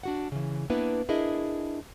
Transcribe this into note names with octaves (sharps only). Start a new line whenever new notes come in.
D4 F#4 F#5
C#3 E3
A#3 B3 D4 E4 B4
D4 E4 G#4 A#4 D#5